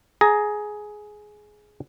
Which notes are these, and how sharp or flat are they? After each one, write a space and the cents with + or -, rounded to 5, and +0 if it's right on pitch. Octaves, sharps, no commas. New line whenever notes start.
G#4 +10 A#5 +0